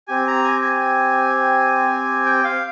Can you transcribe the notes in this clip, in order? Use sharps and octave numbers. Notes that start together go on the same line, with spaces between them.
C4 G4 G#5
A#5
G#5
G#5
G5
F5